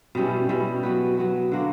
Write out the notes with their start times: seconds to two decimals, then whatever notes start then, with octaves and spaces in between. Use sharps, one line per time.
0.15 B2 G3 C#4 E4
0.49 B2 G3 C#4 E4
0.83 F#3 B3 F#4 B4
1.17 F#3 B3 F#4 B4
1.52 D3 A#3 D4 F#4